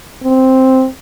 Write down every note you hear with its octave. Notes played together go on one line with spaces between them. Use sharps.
C4